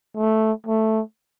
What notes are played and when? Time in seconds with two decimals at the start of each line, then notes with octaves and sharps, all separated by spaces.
0.17 A3
0.67 A3